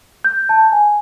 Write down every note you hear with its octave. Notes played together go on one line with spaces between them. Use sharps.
G6
A5
G#5